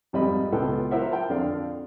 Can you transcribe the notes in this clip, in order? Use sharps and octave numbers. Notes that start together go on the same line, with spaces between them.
G#1 F2 G3 D5 D#5 B5
C#2 B3 F4 A4 B4 G5
E4 F4 A#4 C5 E5 F#5
G5 A5
F2 D3 D5 F5